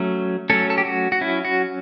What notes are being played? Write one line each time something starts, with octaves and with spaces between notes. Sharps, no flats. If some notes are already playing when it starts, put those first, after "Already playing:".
Already playing: F#3 A3 C#4
F#3 A3 C#4 A4
A4
G4
F#4
F#4
F#3 C#4 E4
F#4